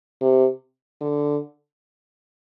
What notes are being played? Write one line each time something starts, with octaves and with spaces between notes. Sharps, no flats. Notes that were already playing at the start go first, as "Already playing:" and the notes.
C3
D3